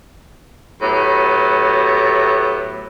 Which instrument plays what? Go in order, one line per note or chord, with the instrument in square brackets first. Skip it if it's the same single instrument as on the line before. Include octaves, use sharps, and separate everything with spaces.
[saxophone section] A2 F#3 B3 G4